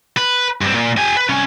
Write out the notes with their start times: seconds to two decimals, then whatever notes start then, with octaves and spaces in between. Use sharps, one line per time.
0.17 B4
0.61 G2 C4
0.74 A#2
0.97 G4 G#5
1.17 B4
1.29 C2 C#4